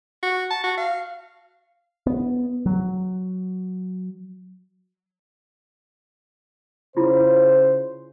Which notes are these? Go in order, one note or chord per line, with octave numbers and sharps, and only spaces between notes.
F#4
A5
F#4
F5
B3
F#3
C#3 E4 F4 C5